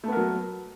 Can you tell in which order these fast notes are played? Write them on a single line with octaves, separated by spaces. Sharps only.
A3 B3 A#4 F#3